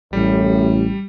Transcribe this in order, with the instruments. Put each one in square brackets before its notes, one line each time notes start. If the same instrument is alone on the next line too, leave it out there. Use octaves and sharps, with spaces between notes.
[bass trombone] A1 [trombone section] F#2 A2 [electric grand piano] G3